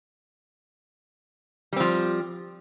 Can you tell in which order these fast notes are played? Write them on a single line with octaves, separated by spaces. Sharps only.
G3 C4 F3